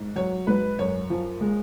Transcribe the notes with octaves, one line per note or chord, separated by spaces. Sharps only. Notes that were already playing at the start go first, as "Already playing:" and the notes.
Already playing: G#2
F#3 C#5
G#2 B4
F#2 C#5
F3
G#3